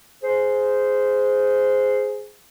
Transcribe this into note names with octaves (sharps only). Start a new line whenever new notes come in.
G#4 C5